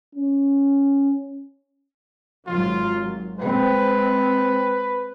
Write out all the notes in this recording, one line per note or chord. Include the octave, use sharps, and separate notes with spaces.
C#4
G#1 F#3 F4
G#3 C4 B4